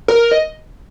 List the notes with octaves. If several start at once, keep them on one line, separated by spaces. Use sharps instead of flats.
A#4
D#5